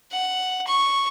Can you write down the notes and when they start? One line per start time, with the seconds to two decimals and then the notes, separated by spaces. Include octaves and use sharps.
0.11 F#5
0.67 C#6